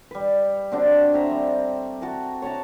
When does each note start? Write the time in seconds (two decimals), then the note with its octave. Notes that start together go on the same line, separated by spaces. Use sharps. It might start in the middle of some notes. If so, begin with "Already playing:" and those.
0.11 G3 B4
0.72 D3 C4 D4 F#4
1.14 C4 E5 A#5
1.31 G3 C4
2.02 F#4 A5 A#5
2.42 C#5 F#5 A5 A#5